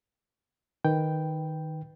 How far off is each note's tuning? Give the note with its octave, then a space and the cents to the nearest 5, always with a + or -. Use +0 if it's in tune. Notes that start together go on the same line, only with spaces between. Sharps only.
D#3 +0 B4 +0 G5 +0